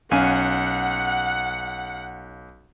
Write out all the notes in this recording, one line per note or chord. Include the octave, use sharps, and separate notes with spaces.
B1 C#4 F5 F#5 G#5